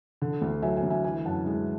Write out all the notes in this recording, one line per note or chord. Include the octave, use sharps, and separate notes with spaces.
D3
D2
F#3 E5 G#5
E5 G#5
D2
E5 G#5
E3 E5 G#5
F#2 F#5 A5
G#3